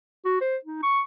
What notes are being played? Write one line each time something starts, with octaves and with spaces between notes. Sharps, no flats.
F#4
C5
D#4
C#6